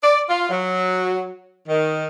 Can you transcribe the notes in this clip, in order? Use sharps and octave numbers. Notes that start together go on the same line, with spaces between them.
D5
F4
F#3
D#3